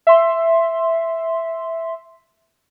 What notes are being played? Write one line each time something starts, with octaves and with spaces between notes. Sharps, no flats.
E5 C6